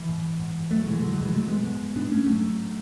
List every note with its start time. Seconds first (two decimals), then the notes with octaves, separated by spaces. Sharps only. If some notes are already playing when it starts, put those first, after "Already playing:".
Already playing: E3
0.09 G#2
0.39 G#2
0.71 E2 F#3 A3
0.86 B2 E3 G#3
1.02 E2 D3 F#3
1.13 D3 F#3
1.18 B2 E3 G#3
1.33 G#2 F#3 A3
1.48 G#3 B3
1.64 G#2
1.96 G#2 B3 D4
2.11 A3 C#4
2.26 G#2 F#3 A3